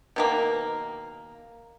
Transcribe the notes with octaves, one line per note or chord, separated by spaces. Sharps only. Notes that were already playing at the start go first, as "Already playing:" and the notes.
B2 D#3 A#3